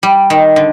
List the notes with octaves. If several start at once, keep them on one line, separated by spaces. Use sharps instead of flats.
G3
D#3
D3